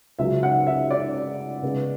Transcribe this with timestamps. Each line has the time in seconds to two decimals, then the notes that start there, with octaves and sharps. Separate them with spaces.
0.19 C#2 C#3 F#3 E5
0.43 F#5
0.67 E5
0.91 D5
1.62 C#3 G#3 B3